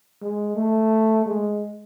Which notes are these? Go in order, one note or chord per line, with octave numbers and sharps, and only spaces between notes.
G#3
A3
G#3